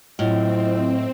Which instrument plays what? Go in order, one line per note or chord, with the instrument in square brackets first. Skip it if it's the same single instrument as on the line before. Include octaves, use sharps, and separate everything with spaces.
[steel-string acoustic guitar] A2 [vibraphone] F#3 E4 F4 [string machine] C4 [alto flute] D#5